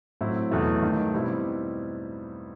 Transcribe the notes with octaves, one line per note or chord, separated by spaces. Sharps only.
A2 F#3 C4 E4
E2 B2 F#3 A3 E4
G2 D#3 F#3 A3
B2 G3 C4 E4